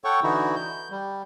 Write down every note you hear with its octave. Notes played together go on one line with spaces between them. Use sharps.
A4 C#5 F#5 G5 C#6
D3 E3 D#4 E4 F#4
G6
G3